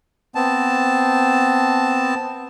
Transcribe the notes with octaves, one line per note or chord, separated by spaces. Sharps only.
B3 C4 A5